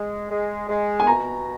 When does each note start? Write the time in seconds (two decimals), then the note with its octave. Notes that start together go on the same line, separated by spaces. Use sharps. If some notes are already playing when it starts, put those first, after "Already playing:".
Already playing: G#3
0.31 G#3
0.69 G#3
1.00 G#5
1.07 B2 A#5